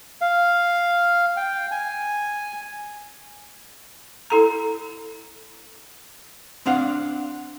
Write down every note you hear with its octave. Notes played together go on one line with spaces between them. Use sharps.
F5
G5
G#5
E4 A4 A#5
C4 D4 F5 F#5